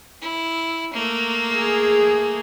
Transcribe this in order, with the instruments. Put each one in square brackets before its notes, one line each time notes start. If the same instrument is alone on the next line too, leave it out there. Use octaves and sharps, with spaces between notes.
[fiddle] E4
A3 A#3
[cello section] G#4